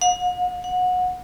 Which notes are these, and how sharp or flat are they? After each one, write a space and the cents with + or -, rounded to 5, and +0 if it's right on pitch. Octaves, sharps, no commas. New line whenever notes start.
F#5 -45
F#5 -25